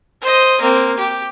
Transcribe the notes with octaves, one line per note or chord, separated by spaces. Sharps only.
C5 D#5
A#3 C4
G4